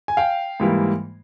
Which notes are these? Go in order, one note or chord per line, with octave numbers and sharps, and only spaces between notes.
G#5
F5 G5
G#2 E3 G3 A#3